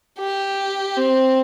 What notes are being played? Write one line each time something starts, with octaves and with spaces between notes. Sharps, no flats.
G4
C4